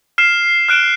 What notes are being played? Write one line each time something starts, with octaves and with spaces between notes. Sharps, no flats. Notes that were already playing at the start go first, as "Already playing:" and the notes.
F6 C7 E7
F6 F#6 D7 E7 G7